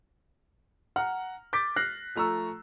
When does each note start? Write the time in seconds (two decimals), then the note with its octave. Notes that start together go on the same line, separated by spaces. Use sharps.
0.96 F#5 A#5 F6
1.53 D6 G6 A6 B6
1.76 F6 F#6 A#6 C7
2.15 F3 A3 A#5 C#6 E6